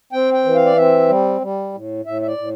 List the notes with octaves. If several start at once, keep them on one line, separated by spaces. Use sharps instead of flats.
C4 G5
G5
E3
F5
D5
C4 E5
G3
G3
A2
A2 E5
E5
D5
A2